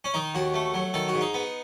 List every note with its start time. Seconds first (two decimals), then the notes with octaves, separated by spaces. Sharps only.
0.04 C#4
0.14 D#3 D#4
0.35 D#2 F#4
0.54 A3
0.74 F#3
0.94 D#3 A4
1.08 F#4
1.14 G#2
1.21 D#4
1.34 B3